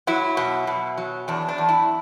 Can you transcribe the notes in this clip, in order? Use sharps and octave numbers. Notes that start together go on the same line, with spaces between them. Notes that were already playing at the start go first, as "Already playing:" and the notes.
F#3 E4
B2
B2
F#3
E2 D4
D4
E2
E4